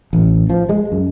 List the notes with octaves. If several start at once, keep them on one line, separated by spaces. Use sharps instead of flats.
A1
F3
G#3
F#2